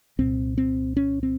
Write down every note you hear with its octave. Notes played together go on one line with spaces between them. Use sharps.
C2 A#2 C4
C4
C#4
C4